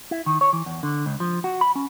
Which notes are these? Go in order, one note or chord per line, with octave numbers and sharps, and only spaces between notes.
E4
D#3
C#5
E3
E2
D3
C#2
F3
F#4
B5
C#4